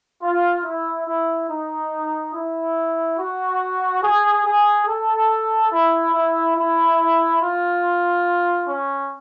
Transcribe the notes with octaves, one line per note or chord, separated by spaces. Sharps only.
F4
E4
E4
D#4
E4
F#4
G#4
G#4
A4
E4
E4
E4
F4
C#4